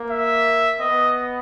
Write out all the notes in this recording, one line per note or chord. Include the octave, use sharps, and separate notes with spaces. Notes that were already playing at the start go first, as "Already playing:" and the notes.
Already playing: A#3
E5
B3 D#5